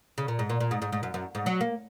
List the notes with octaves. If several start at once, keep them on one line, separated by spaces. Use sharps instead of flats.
C#3
A#2
G#2
A#2
A#2
G#2
G#2
G#2
F#2
F#2
G#2
F#3
A#3